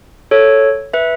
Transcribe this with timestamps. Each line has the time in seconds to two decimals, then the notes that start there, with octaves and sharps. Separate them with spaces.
0.31 A4 C#5
0.93 B4 E5